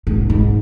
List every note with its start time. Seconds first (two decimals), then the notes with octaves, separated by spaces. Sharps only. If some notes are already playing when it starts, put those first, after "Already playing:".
0.07 G#2
0.30 G#2